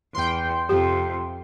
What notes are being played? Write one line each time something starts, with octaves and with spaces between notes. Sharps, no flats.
E2 G5 C6
F2 C3 G4